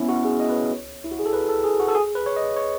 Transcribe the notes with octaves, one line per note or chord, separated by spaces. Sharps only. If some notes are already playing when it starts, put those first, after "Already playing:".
Already playing: B3 C#4 E4
F#4
G#4
D#5
B4
C#5
E4
F#4
G#4
A4
B4
A4
G#4
F#4
A4
G#4
B4
C#5
D#5
C#5